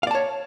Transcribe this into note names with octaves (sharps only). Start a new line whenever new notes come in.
C#5 D5 F5 A5